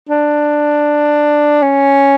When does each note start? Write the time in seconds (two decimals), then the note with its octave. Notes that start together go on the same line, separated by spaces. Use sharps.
0.09 D4
1.63 C#4